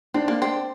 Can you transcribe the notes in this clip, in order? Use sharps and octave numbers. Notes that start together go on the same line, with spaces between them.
C4 D4
A#3
C4